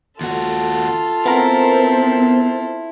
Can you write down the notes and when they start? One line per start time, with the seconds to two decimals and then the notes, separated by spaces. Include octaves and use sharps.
0.21 D#2 F4 F#4 A4
1.26 B3 C4 E4 A#4 C5